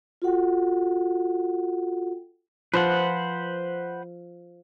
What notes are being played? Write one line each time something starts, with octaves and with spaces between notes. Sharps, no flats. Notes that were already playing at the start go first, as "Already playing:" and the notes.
F4 F#4 A4 F#5 G5
F3 B4 C5 F#5